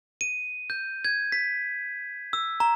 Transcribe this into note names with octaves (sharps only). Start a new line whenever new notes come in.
D#7
G6
G#6
B6
E6
A#5